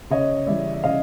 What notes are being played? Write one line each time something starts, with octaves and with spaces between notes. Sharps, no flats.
C#3 C#5 D#5
E3 G3 D5 E5
E5
C#3 D#5 F5